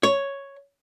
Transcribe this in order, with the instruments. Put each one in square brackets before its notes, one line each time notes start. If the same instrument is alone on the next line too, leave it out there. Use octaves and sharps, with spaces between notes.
[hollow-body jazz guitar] C#5